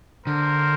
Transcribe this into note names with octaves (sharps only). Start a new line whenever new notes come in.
D3 A#4 C5